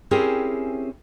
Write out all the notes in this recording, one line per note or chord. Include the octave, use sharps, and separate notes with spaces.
C4 C#4 E4 G4 G#4 A#4